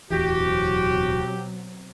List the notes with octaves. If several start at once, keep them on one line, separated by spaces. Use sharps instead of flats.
D1 E2 B2 E3 F#3 C4 F#4 G4